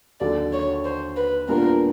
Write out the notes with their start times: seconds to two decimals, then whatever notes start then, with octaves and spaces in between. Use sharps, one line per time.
0.20 D#2 D3 F#3 D5
0.53 C#5
0.84 C5
1.16 B4
1.48 A#2 G3 B3 D4 F4 A#4